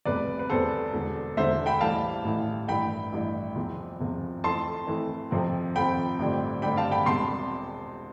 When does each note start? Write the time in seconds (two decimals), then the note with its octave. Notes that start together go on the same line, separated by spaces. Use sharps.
0.05 F1 E2 C3 G3 B4 D5
0.39 B4
0.50 F1 E2 C3 G3 A4 C5
0.93 E1 E2 D3
1.37 E1 E2 D3 C5 E5
1.66 G5 B5
1.81 A1 A2 E3 G3 F5 A5
2.24 A1 A2 E3 G3
2.68 A1 G2 E3 G5 B5
3.12 A1 G2 E3
3.56 E2 C3 F3 C4
4.00 E2 C3 F3 C4
4.44 F2 E3 A3 A5 C6
4.87 F2 E3 A3
5.31 F2 C3 F3 C4
5.76 F2 C3 F3 C4 G5 B5
6.19 A1 G2 D3 G3 C4
6.62 A1 G2 D3 G3 C4 G5 B5
6.77 F5 A5
6.91 G5 B5
7.06 E1 E2 C3 G3 D4 A5 C6